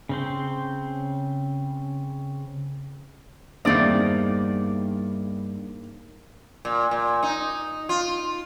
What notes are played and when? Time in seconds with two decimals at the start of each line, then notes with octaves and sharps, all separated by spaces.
0.09 C#3 C4 C5
3.65 E2 G2 D#3 A#3 C4 D#4 D5
6.65 A#2
6.91 A#2
7.23 D#4
7.89 F4